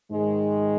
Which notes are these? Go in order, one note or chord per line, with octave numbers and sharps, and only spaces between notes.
G#2 D#3 G#3